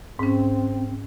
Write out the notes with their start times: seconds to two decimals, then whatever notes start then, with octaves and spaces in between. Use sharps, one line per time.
0.19 G#2 C4 C#4